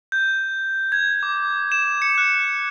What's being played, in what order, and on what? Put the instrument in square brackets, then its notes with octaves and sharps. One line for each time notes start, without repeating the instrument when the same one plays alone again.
[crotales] G6
G#6
D6
E7
C#7
F#6